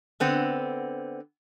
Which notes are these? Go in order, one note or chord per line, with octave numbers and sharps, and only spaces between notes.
D3 B3 C4